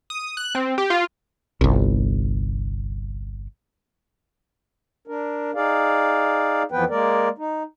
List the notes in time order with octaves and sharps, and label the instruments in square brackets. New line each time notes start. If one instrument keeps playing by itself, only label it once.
[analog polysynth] D#6
F#6
C4
G4
F4
[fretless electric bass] G1 C2
[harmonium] D4 A#4
D#4 G#4 D5 F5
F2 E3 F3 B3 B4 G5
G#3 A#3 A#4 D5
D#4